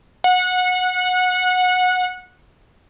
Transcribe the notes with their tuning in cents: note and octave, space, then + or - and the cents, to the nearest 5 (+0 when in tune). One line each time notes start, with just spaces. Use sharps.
F#5 -20